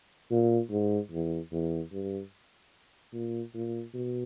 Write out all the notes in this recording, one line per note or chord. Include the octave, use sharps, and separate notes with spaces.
A#2
G#2
E2
E2
G2
A#2
A#2
B2